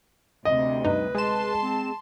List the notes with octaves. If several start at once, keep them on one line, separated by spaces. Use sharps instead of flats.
D2 C3 D#5
G2 D#4 B4
G#3 A5 C6 E7
C4